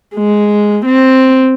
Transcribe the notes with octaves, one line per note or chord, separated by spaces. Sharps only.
G#3
C4